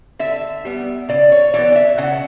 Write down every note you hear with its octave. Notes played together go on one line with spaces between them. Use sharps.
D3 E5
G3 B3
C#3 D5
C#5
E3 B3 D5
D5
E5
C#3 F#5